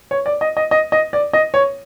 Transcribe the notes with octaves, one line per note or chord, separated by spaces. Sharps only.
C#5
D5
D#5
D#5
D#5
D#5
D5
D#5
C#5